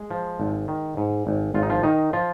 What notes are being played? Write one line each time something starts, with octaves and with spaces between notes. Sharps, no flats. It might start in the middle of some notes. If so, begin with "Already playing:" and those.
Already playing: G#3 G#4
F3
G#1
D#3
G#2
G#1
G#1 F4
D#4
F3 F4
D#3 D#4
F3 F4